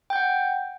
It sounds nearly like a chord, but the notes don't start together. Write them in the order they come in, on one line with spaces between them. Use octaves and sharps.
G5 G6 F#5